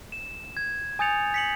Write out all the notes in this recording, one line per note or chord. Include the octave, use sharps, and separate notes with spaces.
E7
G#6
G#5 D#6 G6 A6 C#7 F7
B6 C#7 F#7